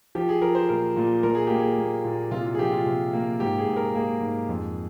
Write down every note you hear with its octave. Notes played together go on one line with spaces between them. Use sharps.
F3 G4
G#4
F3 A#4
C5
A#2 A#4
A#2
A#2 A#4
G#4
A#3 G4
G#4
A#3
A#2
C3 F4
F4
G#4
F3 G4
F4
C3
A#3
G#2 G4
G#4
G#2
A#4
A#3 G#4
G#2
F2